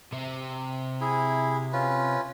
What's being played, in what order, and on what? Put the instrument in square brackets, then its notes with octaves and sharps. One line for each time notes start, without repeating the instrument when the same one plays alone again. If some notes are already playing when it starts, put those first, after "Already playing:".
[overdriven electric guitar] C3 C4
[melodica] E4 G#4
C#4 F4 B4